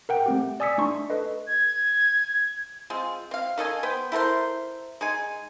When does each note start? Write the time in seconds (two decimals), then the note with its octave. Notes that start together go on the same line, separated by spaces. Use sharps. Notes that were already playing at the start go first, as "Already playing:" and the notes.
0.09 A#4 F#5 G5
0.26 A3 C4 G4
0.60 D5 G#5 D#6 E6 B6 C#7
0.78 A3 D4 D#4 C6 C#6
1.10 A4 B4 D#5
1.47 G#6
2.90 G#3 C4 F4
3.31 C4 F5
3.58 D#3 A4 D#5 G#5
3.83 B3 C5 G5
4.12 E4 A4 A#4 C5
5.01 G#3 D#4 G#5